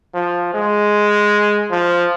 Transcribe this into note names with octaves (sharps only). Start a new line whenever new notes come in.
F3
G#3
F3